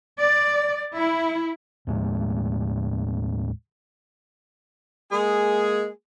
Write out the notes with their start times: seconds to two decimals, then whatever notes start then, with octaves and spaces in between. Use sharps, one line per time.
0.19 D5
0.95 E4
1.87 D#2 A2 G#3 A3
5.11 G#3 A#3 G#4